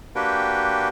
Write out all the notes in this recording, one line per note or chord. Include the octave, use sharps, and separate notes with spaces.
A#3 D4 F#4 G4 B4 G5